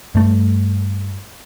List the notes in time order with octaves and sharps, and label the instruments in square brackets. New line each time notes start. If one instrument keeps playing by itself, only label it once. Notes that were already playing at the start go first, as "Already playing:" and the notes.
[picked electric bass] G2 A3